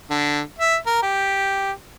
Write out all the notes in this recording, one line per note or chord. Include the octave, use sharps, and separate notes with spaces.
D3
E5
A#4
G4